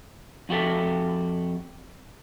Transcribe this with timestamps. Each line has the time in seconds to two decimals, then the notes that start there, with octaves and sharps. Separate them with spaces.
0.49 F2 F#4 G4 A4 E5